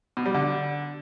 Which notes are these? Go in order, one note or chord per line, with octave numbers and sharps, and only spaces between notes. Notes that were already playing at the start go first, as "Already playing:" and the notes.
B2
G3
D3